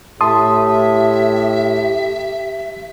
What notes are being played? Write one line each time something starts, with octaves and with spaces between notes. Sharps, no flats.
A2 G4 E5 A5 C6 D#6